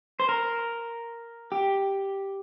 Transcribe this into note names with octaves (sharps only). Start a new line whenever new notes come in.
C5
A#4
G4